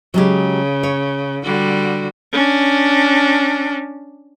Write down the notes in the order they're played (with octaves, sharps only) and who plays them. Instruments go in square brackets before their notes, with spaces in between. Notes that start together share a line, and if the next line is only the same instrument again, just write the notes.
[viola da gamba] C#3 [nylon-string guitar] F#3 G#3 G4
[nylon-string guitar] C#5
[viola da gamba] D3 G3 F#4
[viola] C#4 D4